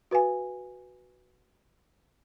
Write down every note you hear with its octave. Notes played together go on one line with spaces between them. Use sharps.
F#4 B4 F5 G#5